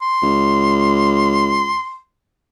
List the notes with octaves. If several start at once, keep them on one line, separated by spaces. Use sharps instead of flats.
C6
C#2